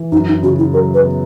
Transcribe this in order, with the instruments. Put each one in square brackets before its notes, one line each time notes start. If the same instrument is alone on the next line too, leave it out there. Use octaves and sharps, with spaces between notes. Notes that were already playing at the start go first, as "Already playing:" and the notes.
Already playing: [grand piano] E3
[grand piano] F#2 [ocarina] D#4
[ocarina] D#4
[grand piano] C#3 [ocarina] F#4
[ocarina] E4
[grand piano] F#3 [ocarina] A#4
[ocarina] B4
[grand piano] B3